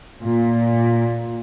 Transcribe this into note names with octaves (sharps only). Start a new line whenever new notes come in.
A#2